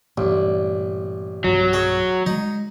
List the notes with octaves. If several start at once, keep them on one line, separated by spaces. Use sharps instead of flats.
A1 G2 A#2 D5
B1 G2 F#3
G#4 C#5
D#3 G#3 D#4